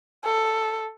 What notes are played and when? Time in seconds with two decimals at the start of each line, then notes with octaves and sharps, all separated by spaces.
0.25 A4